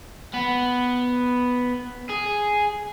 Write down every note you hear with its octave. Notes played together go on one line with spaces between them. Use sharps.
B3
G#4